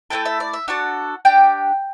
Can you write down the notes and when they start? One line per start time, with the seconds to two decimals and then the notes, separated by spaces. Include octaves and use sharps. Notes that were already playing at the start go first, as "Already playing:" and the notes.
0.10 A3 C4 E4 A4 G5
0.25 E5
0.40 D5
0.53 E5
0.68 D4 F#4 A4 F#5
1.25 D4 G4 G5